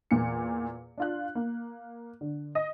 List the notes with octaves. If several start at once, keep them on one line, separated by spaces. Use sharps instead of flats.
E2 A#2 C#7
D4 F4 F#6
A#3
D3
D#5